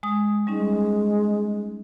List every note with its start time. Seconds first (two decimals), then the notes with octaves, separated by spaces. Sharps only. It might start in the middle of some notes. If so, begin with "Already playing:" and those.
0.03 G#3 D#6
0.47 G3 G#3 C#4 D#4